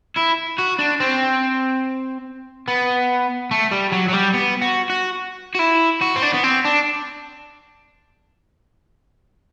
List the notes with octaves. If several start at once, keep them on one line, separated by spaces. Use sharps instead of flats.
E4
F#4
D4
C4
B3
A3
G3
F#3
F#3
G3
B3
F#4
F#4
F#4
E4
F#4
C4
D4
B3
C4
D4